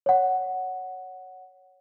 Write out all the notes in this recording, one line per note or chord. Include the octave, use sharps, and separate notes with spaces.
C#5 F#5